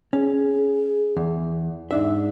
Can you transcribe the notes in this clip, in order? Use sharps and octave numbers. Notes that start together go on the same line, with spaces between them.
C#4 G#4
E2
G#2 D4 D#4 E5